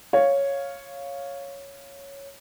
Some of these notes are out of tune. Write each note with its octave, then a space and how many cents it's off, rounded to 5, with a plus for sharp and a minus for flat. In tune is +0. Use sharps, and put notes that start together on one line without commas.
C#5 +0 F5 +0